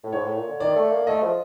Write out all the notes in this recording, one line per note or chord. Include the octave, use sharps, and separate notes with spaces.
A2
G#2 C#5
A2
A#2
D3
D#3 D5
A3
A#3
A3 D#5
F3